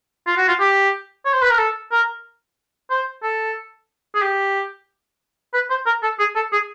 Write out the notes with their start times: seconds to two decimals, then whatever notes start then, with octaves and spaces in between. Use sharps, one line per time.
0.27 F4
0.37 F#4
0.48 F4
0.60 G4
1.25 C#5
1.33 C5
1.42 B4
1.50 A#4
1.58 A4
1.92 A#4
2.90 C5
3.23 A4
4.15 G#4
4.22 G4
5.54 B4
5.70 C5
5.86 A#4
6.03 A4
6.19 G#4
6.36 A4
6.52 G#4